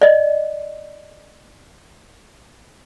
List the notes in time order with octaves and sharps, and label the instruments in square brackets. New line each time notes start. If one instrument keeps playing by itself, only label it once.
[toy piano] D5 D#5